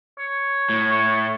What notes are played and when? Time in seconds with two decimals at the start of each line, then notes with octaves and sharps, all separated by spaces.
0.18 C#5
0.69 A2